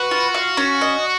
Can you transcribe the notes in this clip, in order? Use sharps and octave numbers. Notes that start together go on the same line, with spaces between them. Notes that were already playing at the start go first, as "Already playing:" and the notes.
Already playing: F#4 B4
F4
F5
C#4
D#5